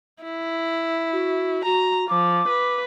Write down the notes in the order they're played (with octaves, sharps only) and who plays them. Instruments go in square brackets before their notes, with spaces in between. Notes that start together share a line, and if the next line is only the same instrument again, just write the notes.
[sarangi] E4
[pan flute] F#4
[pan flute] F#4 [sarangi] A#5
[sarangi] F3 [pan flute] D6
[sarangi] B4